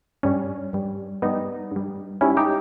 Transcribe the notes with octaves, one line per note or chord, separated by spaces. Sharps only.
G2 G3 C#4
G2 G3
G2 G3 B3 D#4
G2 G3
G#2 G3 C#4 E4
D#4 G4